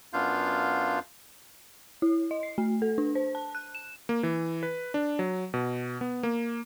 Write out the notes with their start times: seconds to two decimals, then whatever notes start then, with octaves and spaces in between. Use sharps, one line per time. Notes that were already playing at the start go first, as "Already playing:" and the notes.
0.13 F#2 B3 D4 F4 F5 G6
2.02 E4
2.31 D#5
2.43 C7
2.58 A3
2.82 A4
2.98 D4
3.15 C5
3.35 A5
3.55 F#6
3.75 E7
4.09 A#3
4.23 E3
4.63 B4
4.94 D4
5.19 F#3
5.54 B2
6.01 B3
6.23 A#3